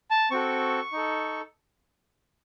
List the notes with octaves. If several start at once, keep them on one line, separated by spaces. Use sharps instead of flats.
A5
C4 F#4 A4 C#6
D#4 A4